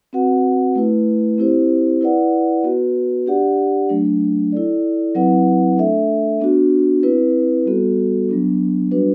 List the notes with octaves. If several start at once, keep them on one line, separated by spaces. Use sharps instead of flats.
C4 F#4 B4 F#5
A3 E4 B4
C4 E4 G4 C5
E4 B4 D5 F#5
B3 F#4 B4
D4 G4 D5 F#5
F#3 A3 D4
E4 A4 D5
F#3 C4 E4 B4 F#5
A3 D4 A4 E5
B3 D4 F#4
C4 E4 B4
G3 B3 F#4 A4
F#3 B3 D4
G3 D4 F#4 B4